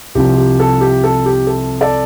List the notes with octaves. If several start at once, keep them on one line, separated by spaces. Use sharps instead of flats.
C2 C3 F3 G4
G4
A4
G4
A4
G4
A4
A4 D5